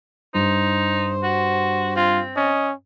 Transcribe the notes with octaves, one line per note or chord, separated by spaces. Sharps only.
G2 D#4 C5
F#4
C4 F4
C#4 D#5